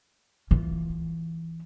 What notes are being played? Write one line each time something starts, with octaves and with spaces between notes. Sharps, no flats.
E3 F4